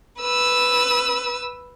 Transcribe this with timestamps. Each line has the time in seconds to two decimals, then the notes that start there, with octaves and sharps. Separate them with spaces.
0.21 B4 E6